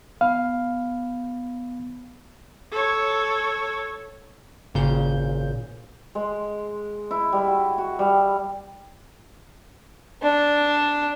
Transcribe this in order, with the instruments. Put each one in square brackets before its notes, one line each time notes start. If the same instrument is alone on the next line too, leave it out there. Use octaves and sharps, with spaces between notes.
[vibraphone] B3 [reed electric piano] F5
[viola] A4 C#5
[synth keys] G#1 A#2 C#3 G6
[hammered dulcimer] G#3
E4
G3
F#4
F#4
G3
[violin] D4